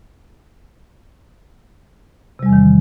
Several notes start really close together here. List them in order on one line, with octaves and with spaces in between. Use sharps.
C3 G3 E2 E3 D#3